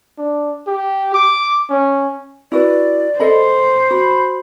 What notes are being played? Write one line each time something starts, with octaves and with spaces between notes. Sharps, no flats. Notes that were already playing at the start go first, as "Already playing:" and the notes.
D4
G4
D6
C#4
E4 F#4 B4 D5
A4 C5 D#5 B5
F#4 B5